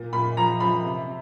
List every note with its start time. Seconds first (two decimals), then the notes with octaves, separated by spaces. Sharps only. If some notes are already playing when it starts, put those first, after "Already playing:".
Already playing: A#2
0.13 A#2 B5
0.37 F3 A#5
0.60 F3 B5
0.84 C3